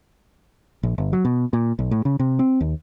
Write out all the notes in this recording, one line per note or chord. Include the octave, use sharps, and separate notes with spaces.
A#1
G1
F#3
B2
A#2
B1
A2
C#3
C3
C4
D#2